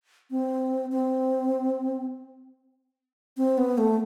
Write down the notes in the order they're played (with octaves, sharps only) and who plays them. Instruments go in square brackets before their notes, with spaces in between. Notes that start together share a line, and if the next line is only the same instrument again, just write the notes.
[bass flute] C4
C4
C4
B3
A3